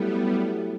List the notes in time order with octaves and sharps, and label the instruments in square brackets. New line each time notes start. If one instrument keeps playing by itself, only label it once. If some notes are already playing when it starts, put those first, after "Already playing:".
Already playing: [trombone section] F#3 A3 E4 G4 [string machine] G3 B3